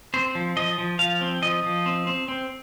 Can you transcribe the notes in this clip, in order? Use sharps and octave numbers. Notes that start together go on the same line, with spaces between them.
C4 C5
F3
F3 D#5
F3
F3 F5
C4
F3 D#5
F3
C4
C4
C4